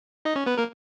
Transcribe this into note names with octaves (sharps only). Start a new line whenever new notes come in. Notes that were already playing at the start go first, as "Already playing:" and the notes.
D#4 D#5
C#4 C#5
B3 B4
A#3 A#4